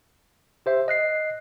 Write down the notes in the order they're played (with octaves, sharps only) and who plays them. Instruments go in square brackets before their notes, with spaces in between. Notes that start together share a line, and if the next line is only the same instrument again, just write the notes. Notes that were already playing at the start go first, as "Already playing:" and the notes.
[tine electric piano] G4 C5 E5
D#5 F#6 C7